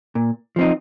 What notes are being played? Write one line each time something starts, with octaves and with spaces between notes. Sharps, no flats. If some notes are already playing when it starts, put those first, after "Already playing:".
A#2
F3 C4 D#4